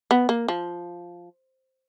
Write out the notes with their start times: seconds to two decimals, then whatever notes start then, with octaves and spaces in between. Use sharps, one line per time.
0.11 B3
0.29 A#3
0.48 F3